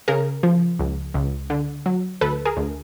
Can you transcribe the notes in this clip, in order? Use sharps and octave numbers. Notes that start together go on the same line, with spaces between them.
C#3 G#4 A#4
F3
C#2
C#2
D3
F#3
D2 A4 B4
G#4 A#4
D2